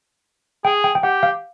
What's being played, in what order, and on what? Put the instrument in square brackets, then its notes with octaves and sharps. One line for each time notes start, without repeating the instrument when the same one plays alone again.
[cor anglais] G#4 [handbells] G5
[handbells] G5
G5
[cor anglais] G4 [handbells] F#5
[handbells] F5